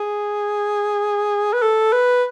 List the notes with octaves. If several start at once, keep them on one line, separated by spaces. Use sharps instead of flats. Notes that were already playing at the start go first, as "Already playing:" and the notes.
Already playing: G#4
B4
A4
B4